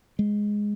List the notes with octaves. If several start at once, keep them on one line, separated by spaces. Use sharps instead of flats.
G#3